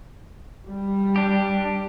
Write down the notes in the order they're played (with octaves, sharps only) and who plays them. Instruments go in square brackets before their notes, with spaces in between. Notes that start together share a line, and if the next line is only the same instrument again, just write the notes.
[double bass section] G3
[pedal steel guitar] D4 G4